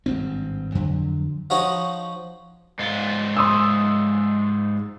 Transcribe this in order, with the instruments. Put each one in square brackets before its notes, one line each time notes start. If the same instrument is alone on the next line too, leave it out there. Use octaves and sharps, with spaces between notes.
[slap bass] G#1 G2 C4
F2 D3 F#3
[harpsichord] F3 D#4 F#4 C#5 D#5
[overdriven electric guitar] G#2 F4
[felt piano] C6 D#6 E6